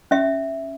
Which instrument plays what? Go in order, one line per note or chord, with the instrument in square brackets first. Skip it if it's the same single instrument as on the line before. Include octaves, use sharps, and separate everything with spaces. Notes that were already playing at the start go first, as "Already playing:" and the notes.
[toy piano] C#4 E5